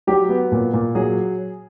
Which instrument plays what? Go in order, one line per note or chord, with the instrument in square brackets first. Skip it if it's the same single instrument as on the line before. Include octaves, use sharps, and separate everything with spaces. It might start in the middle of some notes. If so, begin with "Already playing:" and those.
[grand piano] F#3 G4
B3
A#2
A#2
F#3 G#4